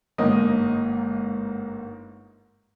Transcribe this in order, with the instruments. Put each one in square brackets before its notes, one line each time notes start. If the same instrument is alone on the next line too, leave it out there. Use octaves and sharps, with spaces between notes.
[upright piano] G1 G#2 A#3 D#5 D#6